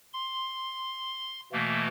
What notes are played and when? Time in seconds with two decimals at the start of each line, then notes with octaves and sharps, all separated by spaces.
0.13 C6
1.52 B2 E3 A3 A#3